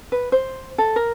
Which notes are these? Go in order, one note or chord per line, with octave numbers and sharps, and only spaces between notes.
B4
C5
A4
A#4